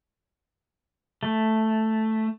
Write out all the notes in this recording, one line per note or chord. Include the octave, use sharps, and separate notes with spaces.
A3